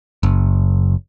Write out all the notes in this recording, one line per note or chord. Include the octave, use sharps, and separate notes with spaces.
F#1